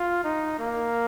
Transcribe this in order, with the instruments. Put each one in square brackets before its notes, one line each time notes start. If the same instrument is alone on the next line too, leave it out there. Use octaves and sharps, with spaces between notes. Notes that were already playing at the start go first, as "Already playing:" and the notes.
Already playing: [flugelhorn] F4
D#4
A#3